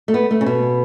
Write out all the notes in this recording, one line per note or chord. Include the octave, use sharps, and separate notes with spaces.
A3
B3
A3
C#3
B2